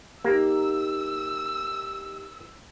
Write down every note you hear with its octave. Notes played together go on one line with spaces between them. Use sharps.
A#3 D#4 G4 E6